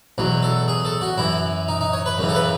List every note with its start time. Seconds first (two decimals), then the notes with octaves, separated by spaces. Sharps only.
0.18 E2 B2 F#3
0.42 A4
0.68 G#4
0.85 A4
1.01 F#4
1.18 F#2 E3 E4
1.68 D#4
1.81 D#4
1.93 C#5
2.06 B4
2.18 F#2 C#3 E3
2.29 A4
2.35 B4